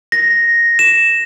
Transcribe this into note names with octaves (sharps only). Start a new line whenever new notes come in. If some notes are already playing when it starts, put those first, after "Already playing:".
A#6
E7